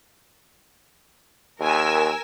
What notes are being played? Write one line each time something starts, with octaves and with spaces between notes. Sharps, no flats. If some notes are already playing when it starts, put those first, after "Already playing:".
D#2 A#4 G#5 E6